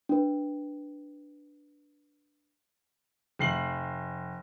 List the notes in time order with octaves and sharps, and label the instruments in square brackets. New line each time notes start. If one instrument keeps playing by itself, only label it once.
[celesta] D4 B4
[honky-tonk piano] F1 C7 F#7